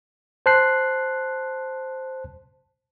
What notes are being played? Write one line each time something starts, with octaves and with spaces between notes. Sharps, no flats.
C5 A5 F#6 C7